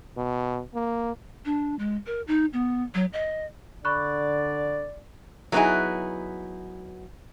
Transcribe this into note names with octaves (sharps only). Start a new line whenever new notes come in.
B2
A#3
D4
G#3
A#4
D#4
B3
F#3
D#5
D3 D5 B5 C#6 F#6
F#3 A3 B3 D#4 E4 G#4